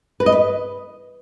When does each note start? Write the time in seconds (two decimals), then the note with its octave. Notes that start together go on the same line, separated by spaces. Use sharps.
0.20 B4
0.26 D#5
0.32 B4